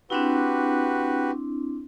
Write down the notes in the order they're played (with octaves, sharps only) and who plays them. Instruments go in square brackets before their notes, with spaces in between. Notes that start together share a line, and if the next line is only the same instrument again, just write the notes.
[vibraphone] C4 D4 E4 [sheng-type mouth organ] F#4 G4 B4